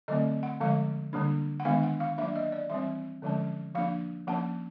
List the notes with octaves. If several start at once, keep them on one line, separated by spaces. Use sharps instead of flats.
D3 F#3 A3 C4 D#5
F#5
D3 F3 G#3 F5
D3 G3 A#3 D4
F#5
D#3 G#3 B3 D4 F5
F#5
F5
F#3 A#3 D4 E5
D#5
D5
E3 G3 C4 E5
D3 F3 G#3 C#4
F3 A#3 D4 F5
F3 A#3 C#4 F#5